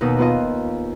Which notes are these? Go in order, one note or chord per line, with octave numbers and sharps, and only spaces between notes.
D#2 B2 D#3 D#6
B3 F4 C5 D#5